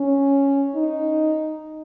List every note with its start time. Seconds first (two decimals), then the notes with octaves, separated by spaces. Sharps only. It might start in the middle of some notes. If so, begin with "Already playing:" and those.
Already playing: C#4
0.75 D#4